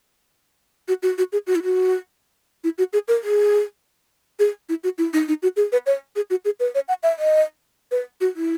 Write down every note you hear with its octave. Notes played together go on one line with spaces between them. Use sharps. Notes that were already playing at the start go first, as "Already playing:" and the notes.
F#4
F#4
F#4
G#4
F#4
E4
F#4
E4
F#4
G#4
A#4
G#4
G#4
E4
F#4
E4
D#4
D#4
F#4
G#4
B4
C#5
G#4
F#4
G#4
B4
C#5
F#5
E5
D#5
B4
F#4
E4